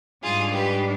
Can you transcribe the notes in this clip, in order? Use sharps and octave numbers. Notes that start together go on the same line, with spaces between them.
G#2 G3 D4 F4 G#4
G4 B4